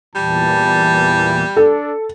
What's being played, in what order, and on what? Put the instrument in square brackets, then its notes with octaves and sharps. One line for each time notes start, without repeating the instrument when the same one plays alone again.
[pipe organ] E2 A#2 E3 [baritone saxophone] G3 [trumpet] A5
[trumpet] D4 [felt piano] A4